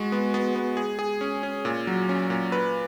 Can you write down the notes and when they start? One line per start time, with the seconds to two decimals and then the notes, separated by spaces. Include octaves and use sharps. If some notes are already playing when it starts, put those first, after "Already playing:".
Already playing: G#3 F#4
0.12 B3
0.34 B3
0.56 B3
0.77 G#4
0.99 G#4
1.21 C#4
1.43 C#4
1.65 A#2
1.87 F#3
2.09 C#4
2.30 A#2
2.52 B4